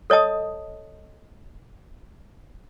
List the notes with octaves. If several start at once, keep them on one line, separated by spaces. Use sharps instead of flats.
A4 C#5 D#5 A5 D#6